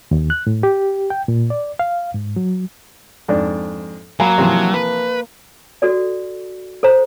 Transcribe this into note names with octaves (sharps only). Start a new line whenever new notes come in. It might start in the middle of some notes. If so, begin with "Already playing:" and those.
D#2
F#6
A2
G4
G5
A#2
D5
F5
G#2
F#3
F2 G#2 D4
F#3 A#3 G#5 B5
C3 E3 F3
B4
F#4 A4 D5
A4 C5 A#5